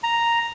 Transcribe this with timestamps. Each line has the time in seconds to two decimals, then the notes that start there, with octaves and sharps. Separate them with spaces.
0.03 A#5